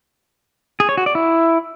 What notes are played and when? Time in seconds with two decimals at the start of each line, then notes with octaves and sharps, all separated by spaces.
0.80 G#4
0.89 C#5
0.97 F#4
1.06 D5
1.15 E4